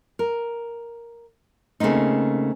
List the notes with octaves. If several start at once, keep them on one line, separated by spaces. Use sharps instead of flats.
A#4
C#3 A3 A#3 C4 D#4